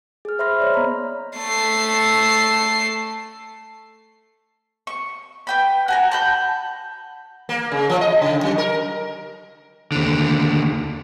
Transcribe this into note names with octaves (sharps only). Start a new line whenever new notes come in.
G#4 F6
C5 E5 B5 C6 F6 A#6
C#5 D5
B3 D#5 A#5 B5
A3 C7
C#6
B4 G5 B5
F#4 G#5 A#5
A5 B5 G6
A#3
C#3
F3
D#5
C#3
F#3
A#4
D#2 D3